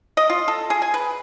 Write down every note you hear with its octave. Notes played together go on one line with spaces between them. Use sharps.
D#5
F4
A4
G#4
G#5
B4